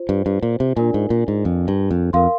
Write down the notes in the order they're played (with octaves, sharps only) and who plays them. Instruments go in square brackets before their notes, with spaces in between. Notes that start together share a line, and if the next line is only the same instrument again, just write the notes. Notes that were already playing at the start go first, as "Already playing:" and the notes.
Already playing: [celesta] F4 C5
[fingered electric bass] G2
G2
A#2
C3
[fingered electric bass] A#2 [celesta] D4 F4 A#4 D5 G#5
[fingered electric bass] G#2
A#2
G#2
F2
G2
F2
[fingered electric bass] F2 [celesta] A#4 F5 C6